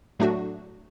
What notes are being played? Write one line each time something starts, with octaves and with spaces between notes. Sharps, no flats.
A2 F#3 A3 D4 F#4